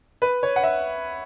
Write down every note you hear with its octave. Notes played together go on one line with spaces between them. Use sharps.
B4
C#5
F#5
E5